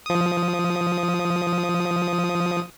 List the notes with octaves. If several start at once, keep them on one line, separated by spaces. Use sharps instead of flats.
F3 D#6